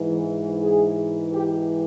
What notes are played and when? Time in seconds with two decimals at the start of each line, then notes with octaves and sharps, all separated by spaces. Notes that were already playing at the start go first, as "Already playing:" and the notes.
Already playing: G#2 E3
0.61 G#4
1.33 G4